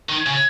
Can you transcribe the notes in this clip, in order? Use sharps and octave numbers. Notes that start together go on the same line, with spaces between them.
D#3
C#3